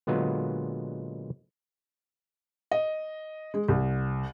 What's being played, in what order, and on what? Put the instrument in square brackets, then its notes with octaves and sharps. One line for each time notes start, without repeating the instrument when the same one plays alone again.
[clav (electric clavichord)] A#2 D3 F#3 G#3 B3 F4
[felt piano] D#5
G#3
C2